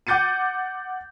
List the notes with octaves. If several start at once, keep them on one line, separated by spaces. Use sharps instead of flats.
F#5 D6 G6 A6 C#7 D#7